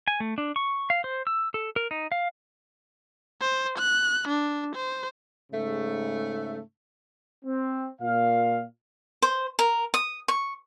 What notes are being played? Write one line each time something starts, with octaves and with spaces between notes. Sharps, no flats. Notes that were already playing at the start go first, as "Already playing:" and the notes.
G#5
A3
D4
C#6
F5
C5
E6
A4
A#4
D#4
F5
C5
F#6
D4
C5
G#2 C#3 A3
C4
A#2 F5
C5
A#4
D#6
C#6